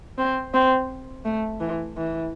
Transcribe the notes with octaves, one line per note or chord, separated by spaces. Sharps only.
C4
C4
A3
E3
E3